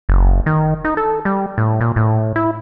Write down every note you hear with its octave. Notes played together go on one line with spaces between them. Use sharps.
F#1
D#3
D#4
A4
G3
A2
A#2
A2
E4